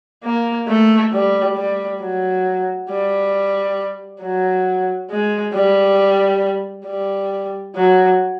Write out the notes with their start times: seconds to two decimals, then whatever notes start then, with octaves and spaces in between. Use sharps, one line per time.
0.24 A#3
0.68 A3
1.13 G3
1.57 G3
2.01 F#3
2.90 G3
4.21 F#3
5.10 G#3
5.54 G3
6.86 G3
7.76 F#3